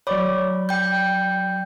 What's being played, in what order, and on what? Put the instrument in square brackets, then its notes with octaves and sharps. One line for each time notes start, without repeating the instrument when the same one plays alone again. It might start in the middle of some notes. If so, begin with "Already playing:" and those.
[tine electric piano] F#3 D5 B5 [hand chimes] C#5 D6
[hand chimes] G5 G6